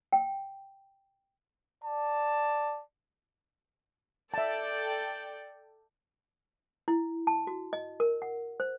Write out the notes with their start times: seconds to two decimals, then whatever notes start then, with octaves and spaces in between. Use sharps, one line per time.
0.13 G5
1.83 D5 A5
4.34 A4 D5 E5 G5 A5
6.88 E4
7.27 A5
7.47 F#4
7.73 D#5
8.00 A#4
8.22 F#5
8.60 C5